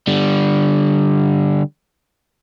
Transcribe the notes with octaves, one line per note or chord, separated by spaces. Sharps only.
D3 G3